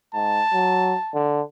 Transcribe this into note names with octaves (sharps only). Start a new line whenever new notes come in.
G#2 A5
F#3
D3